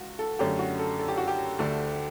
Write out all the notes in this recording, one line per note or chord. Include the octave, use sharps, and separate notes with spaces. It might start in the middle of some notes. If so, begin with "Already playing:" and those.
Already playing: C#2 F#4
A4
F#2 D3 A3 C#4 G4
F#4
A4
A4
G4
F#4
G4
D2 D3 A3